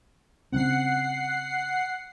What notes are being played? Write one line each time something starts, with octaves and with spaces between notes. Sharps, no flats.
C#3 G3 C4 F#5 C7